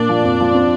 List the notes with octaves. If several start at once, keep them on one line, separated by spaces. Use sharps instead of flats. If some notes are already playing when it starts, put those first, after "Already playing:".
Already playing: A#2 A#3 D4 D5
F3
F2
F3
C4